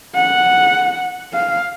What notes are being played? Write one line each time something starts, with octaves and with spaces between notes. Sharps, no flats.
F#5
F5